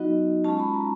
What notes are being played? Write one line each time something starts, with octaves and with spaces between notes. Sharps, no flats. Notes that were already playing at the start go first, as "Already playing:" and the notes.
Already playing: F#3 B3 D#4 F#4 D#5
G#3 C#4 F4 A5
B5
A#5